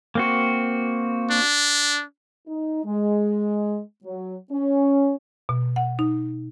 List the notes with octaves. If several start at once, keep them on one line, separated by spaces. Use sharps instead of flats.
A#3 C4 F#4
D4
D#4
G#3
F#3
C#4
B2
F#5
D#4